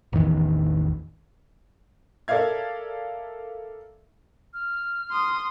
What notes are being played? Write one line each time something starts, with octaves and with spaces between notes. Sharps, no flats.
A1 E2 D#3 E3
A4 A#4 D5 E5 F5 G#6
F6
C6 D#6